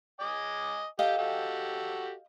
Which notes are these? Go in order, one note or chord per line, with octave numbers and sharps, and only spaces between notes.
D#5 G#5 D6
G4 A4 D#5 F5 G5
F#4 G4 A4